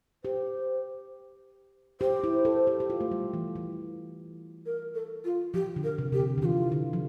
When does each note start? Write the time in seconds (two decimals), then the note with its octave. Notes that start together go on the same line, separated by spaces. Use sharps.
0.24 G4 C5
2.01 G4 C5
2.24 E4
2.45 A4
2.67 G4
2.80 G4
2.90 F4
3.01 A3
3.11 G3
3.34 E3
3.56 E3
4.66 A#4
4.95 A4
5.25 F4
5.54 F3 G4
5.76 D3
5.84 A#4
5.98 C3
6.12 C3 G4
6.20 D3
6.38 D3
6.42 E3 F4 G4
6.72 D3
6.93 F3